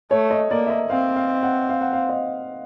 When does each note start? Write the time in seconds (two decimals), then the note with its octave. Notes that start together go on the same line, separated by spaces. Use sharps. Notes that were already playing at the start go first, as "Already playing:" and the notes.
0.11 A3 C#5
0.31 D#5
0.51 A#3 D5
0.67 E5
0.70 D#5
0.90 C4 F5
1.16 F5
1.43 F#5
1.69 F5
1.81 F#5
1.93 F5
2.09 D#5